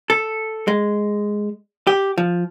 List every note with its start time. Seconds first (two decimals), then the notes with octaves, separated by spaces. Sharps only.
0.10 A4
0.68 G#3
1.87 G4
2.18 F3